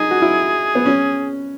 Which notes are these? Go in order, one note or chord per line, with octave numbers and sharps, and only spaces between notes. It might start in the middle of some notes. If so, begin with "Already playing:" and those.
Already playing: D#4 G#4
F#4
E4
B3
C#4